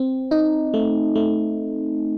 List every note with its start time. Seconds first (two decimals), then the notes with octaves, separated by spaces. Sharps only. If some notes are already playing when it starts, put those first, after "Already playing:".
Already playing: C4
0.31 D#4
0.74 A3
1.15 A3